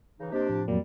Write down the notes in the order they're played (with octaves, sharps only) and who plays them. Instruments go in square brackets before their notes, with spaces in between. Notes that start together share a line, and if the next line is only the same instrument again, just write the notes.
[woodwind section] C#3 E3 D#4
[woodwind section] C3 D4 G4 [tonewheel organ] A#3 C5 D#5
[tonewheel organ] A2 F3
[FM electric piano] F2 F#3 A#3 [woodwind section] G3